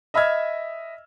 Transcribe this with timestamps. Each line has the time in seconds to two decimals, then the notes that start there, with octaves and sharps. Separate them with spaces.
0.14 D#5 E5 B5 E6 F6 G#6